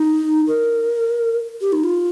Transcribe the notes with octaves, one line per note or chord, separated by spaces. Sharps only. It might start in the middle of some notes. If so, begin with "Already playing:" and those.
Already playing: D#4
A#4
G4
D#4
F4